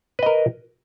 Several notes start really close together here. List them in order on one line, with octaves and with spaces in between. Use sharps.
B4 D#5 A#4